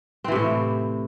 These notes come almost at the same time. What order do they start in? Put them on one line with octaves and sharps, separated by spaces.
C4 E3 C3 A2